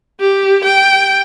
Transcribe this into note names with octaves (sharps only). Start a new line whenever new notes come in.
G4
G5